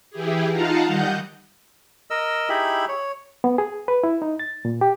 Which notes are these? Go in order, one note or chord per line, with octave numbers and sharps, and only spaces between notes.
E3 E4 G4 G#4
D#4 F4 F5 F#5 A5 A#5
D#3 G3 D#5 F#5 G6
A#4 D#5 E6
D#4 E4 G4 G#4 E5 B5
C#5
B3
G#4
B4
E4
D#4
A6
A#2
G4